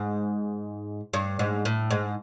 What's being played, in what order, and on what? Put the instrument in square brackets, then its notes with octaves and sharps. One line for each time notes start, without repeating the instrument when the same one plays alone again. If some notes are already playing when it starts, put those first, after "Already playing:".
Already playing: [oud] G#2
G2
G#2
A2
G#2